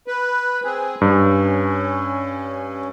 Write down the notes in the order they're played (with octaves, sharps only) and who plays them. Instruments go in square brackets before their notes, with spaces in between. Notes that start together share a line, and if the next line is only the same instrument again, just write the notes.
[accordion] B4
C4 G#4
[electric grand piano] G2 [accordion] C#4